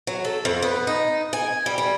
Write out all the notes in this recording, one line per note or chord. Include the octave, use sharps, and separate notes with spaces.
F#3
A4
F2
B3
D#4
G#5
G3
G3